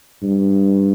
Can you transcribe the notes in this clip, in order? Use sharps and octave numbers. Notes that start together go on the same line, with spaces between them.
G2